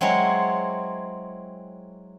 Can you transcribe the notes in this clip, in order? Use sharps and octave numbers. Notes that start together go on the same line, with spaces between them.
F#3 G#3 C4 E4 C#5